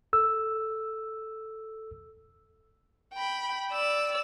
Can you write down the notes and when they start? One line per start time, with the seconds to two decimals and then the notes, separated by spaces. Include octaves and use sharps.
0.13 A4 E6
3.13 G5 B5
3.72 D5 E6